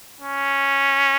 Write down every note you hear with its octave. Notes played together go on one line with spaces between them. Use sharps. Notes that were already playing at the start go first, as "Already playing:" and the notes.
C#4